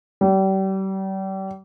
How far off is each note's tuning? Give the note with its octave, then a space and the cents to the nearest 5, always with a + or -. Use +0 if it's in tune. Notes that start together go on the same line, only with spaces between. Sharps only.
G3 -35